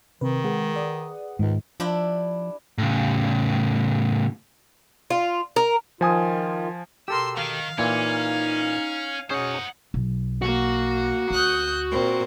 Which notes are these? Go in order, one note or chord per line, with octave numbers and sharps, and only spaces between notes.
C3 D#3 C4 B4
G#3 G#4 B4 F#5
D5 D#6
C#2 G#2 D#3 G#3
F3 D4 E4 G4
A2 C#3
F4
A#4
D#3 F3 F4 G#5 D#6
B2 G4 A4 A#4 C6 E6
D#3 F5
A#2 E3 A#3 C#4 D#4
B2 C#4 D#4 G#4 C5 F#5
B1
A#3 F#4
D2 D#6 F#6 G6
A#2 C4 A#4